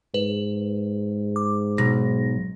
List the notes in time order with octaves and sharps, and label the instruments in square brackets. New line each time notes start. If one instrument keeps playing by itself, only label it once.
[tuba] G#2 [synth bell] B4
[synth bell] D6
[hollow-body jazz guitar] B1 [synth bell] A#6